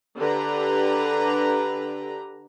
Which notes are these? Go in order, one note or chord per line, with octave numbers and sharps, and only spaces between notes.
D3 G4 B4 A#5